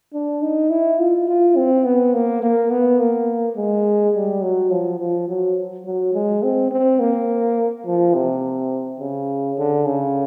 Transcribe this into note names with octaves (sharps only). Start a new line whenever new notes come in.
D4
D#4
E4
F4
F4
C4
B3
A#3
A#3
B3
A#3
G#3
G3
F#3
F3
F3
F#3
F#3
G#3
C4
C4
A#3
F3
C3
C#3
D3
C#3